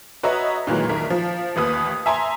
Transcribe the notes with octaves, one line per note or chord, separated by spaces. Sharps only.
F#4 B4 C#5 D#5 E5 A#5
A#2 D#3 E3 F#3 G#3
C2 D#3 A#4 B6
F3
A1 D#2 B4 D#6
E5 G#5 A#5 C6